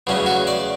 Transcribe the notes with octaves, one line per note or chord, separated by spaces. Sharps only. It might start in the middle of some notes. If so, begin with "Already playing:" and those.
E2 C#3 F#3 A3 C#4
F#4
D5